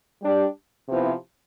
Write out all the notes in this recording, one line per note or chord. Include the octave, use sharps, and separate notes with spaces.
G3 D4 G4 D5
C3 F3 B3 E4